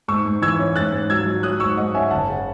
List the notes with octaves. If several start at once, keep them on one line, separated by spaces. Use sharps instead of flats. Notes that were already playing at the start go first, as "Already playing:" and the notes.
G#2 C#6 E6
G#2
E3 E6 G#6
C#4
G#2 F#6 A6
G#2
F#3 E6 G#6
F#3
F#3 D#6 F#6
G#2 C#6 E6
G#2 D#5 F#5
C#4 E5 G#5
F#1 F#5 A5
C#3